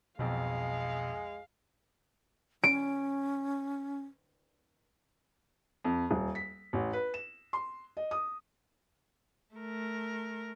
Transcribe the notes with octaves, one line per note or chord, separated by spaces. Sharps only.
B1 F2 B2 G#3 F5
C#4 D7
F2
D#1
B6
A1
B4
E7
C6
D#5
D#6
A3 A#4